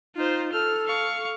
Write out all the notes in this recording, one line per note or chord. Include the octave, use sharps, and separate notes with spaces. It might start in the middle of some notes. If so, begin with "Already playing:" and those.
D#4 F4 C5
A4 F6
F5 C#6